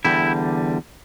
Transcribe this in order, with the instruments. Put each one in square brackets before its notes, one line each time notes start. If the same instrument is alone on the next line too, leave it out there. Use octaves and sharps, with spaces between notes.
[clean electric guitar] E2 D3 G3 E4 G4